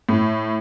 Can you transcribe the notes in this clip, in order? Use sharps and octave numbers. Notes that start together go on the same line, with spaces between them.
A2